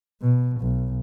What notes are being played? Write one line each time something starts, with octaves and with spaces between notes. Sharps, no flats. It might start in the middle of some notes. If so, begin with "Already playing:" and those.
B2
B1